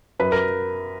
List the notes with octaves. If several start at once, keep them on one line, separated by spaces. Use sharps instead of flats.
F#2 B4
A#4